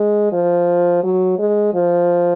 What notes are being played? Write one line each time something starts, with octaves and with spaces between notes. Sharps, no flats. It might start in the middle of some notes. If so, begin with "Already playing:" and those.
Already playing: G#3
F3
F#3
G#3
F3